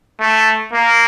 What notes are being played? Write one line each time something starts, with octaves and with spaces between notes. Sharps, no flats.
A3
A#3